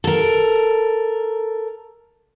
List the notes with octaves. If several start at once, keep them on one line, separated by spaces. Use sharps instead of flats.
A4 A#4